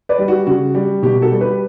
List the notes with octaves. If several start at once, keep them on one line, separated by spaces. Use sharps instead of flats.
B4 D5
G3
F#4
C#3 F#4
G3
B2 G4
F#4 A4
G3
G4 B4